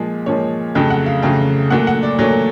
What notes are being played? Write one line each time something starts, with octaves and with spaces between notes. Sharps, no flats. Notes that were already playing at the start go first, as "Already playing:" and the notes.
Already playing: A#2 F3 G#3
A#2 F3 G#3 C#5
F2 C#3 F#3 A3 G5
F#5
F5
F2 C#3 F#3 A3 G5
A#2 F#3 A3 F#5
F#5
D5
A#2 F#3 A3 C#5